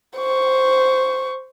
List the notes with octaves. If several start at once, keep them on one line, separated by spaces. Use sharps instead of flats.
C5 C#6